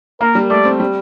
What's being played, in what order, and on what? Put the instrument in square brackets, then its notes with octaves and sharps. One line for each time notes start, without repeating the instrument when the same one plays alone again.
[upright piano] A#3 [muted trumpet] A#4
[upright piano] G3
[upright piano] A3 [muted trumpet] D5
[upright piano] C4
G3